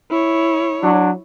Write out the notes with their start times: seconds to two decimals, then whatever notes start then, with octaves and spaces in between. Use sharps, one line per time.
0.10 E4 C#5
0.83 F#3 D4